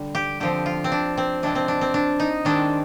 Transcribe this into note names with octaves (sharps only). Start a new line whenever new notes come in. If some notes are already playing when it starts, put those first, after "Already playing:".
Already playing: D3 G3
G4
D3 F3 C4 G4
F4
C4
D4
C4
C3 F3 G#3 C4 D4
C4
D4
C4
D4
D#4
D#3 G#3 C4 D4